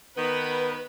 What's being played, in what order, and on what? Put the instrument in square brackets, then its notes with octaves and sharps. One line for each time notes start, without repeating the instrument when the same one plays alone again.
[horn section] D#3 B3 [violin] B4